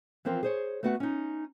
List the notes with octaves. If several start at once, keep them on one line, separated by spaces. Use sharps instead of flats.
E3 F3 C4 F4 A#4
G#4 C5 C#5
A3 B3 F#4 B4 F#5
C#4 D#4